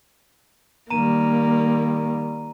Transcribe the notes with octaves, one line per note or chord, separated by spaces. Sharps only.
D#3 G3 A#3 A#5 D#7